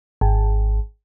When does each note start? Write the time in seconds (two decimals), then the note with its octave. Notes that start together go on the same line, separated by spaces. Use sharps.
0.21 G#1